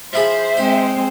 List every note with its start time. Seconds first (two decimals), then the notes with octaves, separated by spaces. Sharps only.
0.13 F3 E4 G#4 C5 E5
0.57 G#3 C4 D#4